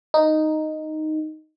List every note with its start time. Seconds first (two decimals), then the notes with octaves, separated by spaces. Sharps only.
0.14 D#4